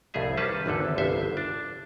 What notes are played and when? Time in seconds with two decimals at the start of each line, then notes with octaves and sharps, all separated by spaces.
0.14 C2 F2 A2 G#4 E5
0.37 D#3 G3 C#4 B4 E5 A5
0.66 G#1 E2 D3 A4
0.98 G1 C2 F2 C5 E5
1.37 D4 A5